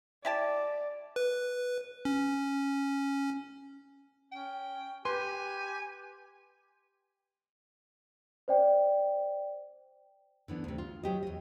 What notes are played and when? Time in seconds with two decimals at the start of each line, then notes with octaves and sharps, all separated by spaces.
0.25 E4 G4 D5 A5
1.16 B4
2.05 C#4
4.32 C#4 G5
5.05 G4 B4 G#5 C6
8.48 C5 D5 G5
10.48 D3 E3 B3 D4
10.64 D2 C3
10.78 F4
11.03 F#3 G4 D#5
11.23 E2 D#5